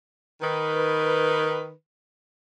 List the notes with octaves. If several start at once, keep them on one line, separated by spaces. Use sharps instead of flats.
D#3 B4